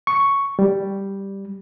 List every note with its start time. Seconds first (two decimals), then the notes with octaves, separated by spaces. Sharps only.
0.07 C#6
0.59 G3